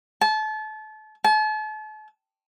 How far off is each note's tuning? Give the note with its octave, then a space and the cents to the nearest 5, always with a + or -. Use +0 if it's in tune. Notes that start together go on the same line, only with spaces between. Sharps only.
A5 -30
A5 -40